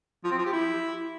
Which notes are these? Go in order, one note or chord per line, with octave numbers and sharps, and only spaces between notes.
F3
C4
F3
G4
E4